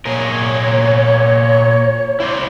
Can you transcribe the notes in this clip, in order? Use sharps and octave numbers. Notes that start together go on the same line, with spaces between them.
A#2 G#4 A#4 C#5
E4 C5 D5